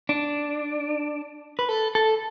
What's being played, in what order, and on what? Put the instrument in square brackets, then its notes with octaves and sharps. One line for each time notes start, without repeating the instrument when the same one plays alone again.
[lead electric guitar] D4
B4
A4
A4